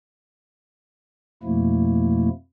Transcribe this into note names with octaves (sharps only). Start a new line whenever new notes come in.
F2 B2 F3 A3 A#3 E4